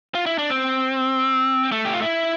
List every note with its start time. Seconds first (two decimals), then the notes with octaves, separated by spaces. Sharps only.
0.15 F4
0.26 E4
0.38 D4
0.50 C4
1.72 A3
1.85 G4
1.93 F4
2.02 E4